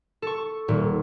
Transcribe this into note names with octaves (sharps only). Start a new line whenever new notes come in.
A4 C#6
D#1